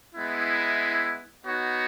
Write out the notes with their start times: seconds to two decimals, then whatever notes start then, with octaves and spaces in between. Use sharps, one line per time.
0.15 G#3 B3 E4
1.46 B3 D#4 F#4 C#5 F#5